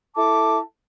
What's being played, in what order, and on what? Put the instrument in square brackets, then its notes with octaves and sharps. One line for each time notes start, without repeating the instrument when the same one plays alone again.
[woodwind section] E4 A4 A5 D6